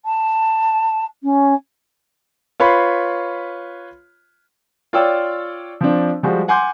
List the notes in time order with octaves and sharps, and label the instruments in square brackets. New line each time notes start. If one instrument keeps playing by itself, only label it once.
[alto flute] A5
C#4
[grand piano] F4 B4 C#5 B5 C6
[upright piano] F4 C#5 D5 G5 E6
F3 C4 D4
F3 G3 G#3 F#4 C5
F#5 G#5 C6 D6 G6